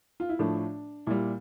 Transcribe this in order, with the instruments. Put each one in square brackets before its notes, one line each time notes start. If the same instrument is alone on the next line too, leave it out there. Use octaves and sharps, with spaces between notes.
[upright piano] F4
E4
A2 F3 A3 D4
A#2 G3 E4